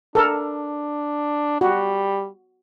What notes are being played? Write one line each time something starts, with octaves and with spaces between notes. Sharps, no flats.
D4 A4 A#4
G3 F#4